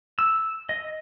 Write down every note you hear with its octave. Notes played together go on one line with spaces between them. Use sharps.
E6
D#5